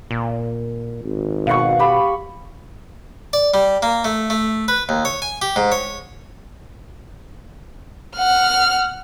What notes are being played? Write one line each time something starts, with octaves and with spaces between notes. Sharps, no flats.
A#2
G#1
B2 F5 F#5 C#6
G4 B5
D5
G3
A#3
A3
A3
B4
D#2
C#5
G#5
G4
G#2
C#5
F#5 F6